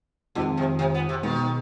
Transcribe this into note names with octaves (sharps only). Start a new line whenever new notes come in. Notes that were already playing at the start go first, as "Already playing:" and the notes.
F2 B2 D#3 G#3 C4 F4
C3
C3
B3
C3
B2 D#3 G#3 B3